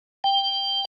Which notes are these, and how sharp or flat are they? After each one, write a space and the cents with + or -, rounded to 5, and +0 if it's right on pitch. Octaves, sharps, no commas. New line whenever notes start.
G5 +10